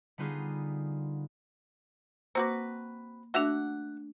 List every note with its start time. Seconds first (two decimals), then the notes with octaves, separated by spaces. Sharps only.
0.18 D3 G3 B3 D#4 F4 G#4
2.35 A#3 C4 F#4 B4 D6
3.34 A3 D4 F#4 E5 F#5